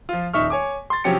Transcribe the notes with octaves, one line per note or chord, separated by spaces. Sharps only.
F3 F4
D#1 D#4 E5 C#6 F6
C#5 G#5 D6
C6 A6
C3 F3 F#3 C#4 G4 C#7